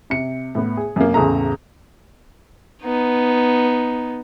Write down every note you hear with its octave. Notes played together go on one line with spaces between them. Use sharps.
C3 C#7
A2 B3
G#4
F#2 C3 A#3
A1 E2 C#3 A4 A#5
B3 D#4